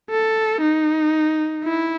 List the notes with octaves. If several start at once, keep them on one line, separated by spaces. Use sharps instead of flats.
A4
D#4
E4